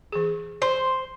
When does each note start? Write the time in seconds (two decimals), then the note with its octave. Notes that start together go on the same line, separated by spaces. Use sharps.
0.12 E3 G#4
0.62 C5